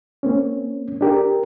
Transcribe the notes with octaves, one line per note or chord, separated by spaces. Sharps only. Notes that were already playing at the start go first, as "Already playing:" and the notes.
A#3 C4 C#4
D4 G4 A#4